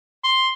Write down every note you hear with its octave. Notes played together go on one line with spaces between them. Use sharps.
C6